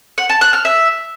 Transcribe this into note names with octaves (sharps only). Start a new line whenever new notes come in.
F#5
A5
F#6
F6
E5